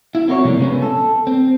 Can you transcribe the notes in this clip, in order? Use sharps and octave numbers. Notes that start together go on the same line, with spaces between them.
E4
C4 F#4 A#4 C5 C#5
C3 F3 G3 A3 A#3
C#3 G#3 B3 C#4
A4
C4